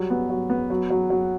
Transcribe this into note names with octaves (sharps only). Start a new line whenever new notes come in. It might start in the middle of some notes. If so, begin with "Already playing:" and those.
Already playing: F#3 G3
B3
F#3
B3
F#3
F#3
F#3